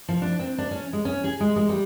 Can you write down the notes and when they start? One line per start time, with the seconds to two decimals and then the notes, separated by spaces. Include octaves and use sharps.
0.09 F3
0.22 D4
0.39 C4
0.58 D4
0.71 C#4
0.93 G#3
1.05 C#4
1.24 G#4
1.40 G#3
1.56 G#3
1.69 G3